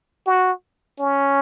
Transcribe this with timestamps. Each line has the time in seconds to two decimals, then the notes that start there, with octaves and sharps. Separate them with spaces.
0.26 F#4
0.99 C#4